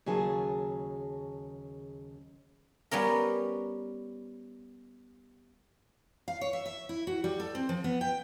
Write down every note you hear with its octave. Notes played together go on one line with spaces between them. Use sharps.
D#2 C#3 F#3 G#4 A5
G3 B3 C#4 A#4
F5
C#5
E5
E5
E4
F#4
G3
A4
C4
F3
B3
G5